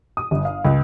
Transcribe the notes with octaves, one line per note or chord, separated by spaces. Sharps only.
D#6
G1
F5
C#2